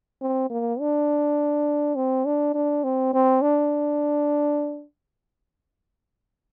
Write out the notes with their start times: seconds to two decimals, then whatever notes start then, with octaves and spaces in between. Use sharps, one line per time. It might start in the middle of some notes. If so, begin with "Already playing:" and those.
0.22 C4
0.50 A#3
0.80 D4
1.96 C4
2.25 D4
2.55 D4
2.84 C4
3.14 C4
3.42 D4